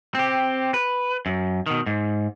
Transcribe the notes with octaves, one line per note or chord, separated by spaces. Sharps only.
C4 G4
B4
F#2
B2 D#3
G#2